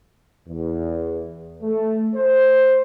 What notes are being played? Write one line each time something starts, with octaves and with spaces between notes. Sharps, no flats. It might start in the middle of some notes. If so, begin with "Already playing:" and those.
E2
A3
C5